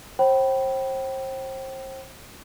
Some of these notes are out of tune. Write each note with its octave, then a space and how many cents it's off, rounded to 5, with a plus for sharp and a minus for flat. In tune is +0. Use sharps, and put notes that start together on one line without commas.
C5 +35 G5 -25 B5 +0